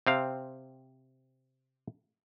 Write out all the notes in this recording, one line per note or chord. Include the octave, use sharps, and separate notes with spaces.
C3 C4 F5